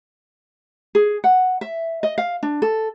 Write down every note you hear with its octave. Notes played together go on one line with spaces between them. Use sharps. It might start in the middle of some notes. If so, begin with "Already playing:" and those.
G#4
F#5
E5
D#5
F5
D4
A4